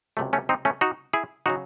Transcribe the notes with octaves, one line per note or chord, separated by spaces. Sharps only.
C#2 C3 F#3 A3
A3 C#4
C4 D#4
A3 C#4
D#4 F#4
E4 G#4
C#3 F#3 D#4 F#4